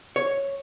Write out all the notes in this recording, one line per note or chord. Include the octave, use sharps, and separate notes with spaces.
C#5